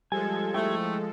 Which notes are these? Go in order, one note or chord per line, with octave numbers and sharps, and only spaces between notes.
F3 G3 G#3 A4 G#5 G#6
A3 E4 G5